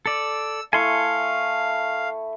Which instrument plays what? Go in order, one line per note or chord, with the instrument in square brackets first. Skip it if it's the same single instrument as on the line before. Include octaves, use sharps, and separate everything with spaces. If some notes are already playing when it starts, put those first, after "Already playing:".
[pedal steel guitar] A4 D5 [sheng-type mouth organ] E6
[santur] A3 E4 [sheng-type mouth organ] F5 [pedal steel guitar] G#5 C6 C#6